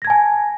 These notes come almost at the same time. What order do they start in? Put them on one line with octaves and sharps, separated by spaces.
A#6 G#6 A5 G#5